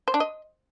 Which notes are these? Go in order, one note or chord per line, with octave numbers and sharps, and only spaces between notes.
C5
D4
D#5